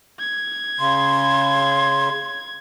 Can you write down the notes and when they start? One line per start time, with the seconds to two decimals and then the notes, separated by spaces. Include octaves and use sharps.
0.20 G#6
0.79 C#3 C6